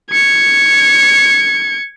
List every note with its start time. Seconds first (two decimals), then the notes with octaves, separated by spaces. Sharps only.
0.11 G#6 C#7